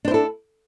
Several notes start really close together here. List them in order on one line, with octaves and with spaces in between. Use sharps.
D4 C5 E4 A4